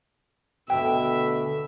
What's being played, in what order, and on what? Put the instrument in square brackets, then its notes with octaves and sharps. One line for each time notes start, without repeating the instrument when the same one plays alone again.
[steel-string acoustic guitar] D2 D3 [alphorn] B2 [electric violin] E5 [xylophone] G5